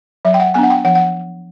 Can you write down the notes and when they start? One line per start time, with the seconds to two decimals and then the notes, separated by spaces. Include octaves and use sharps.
0.25 F#3 E5
0.34 G5
0.40 F#5
0.54 B3 D4 G#5
0.63 F#5
0.70 G5
0.84 F3 F#5
0.95 F#5